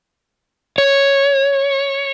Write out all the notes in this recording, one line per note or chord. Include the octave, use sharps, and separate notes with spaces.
C#5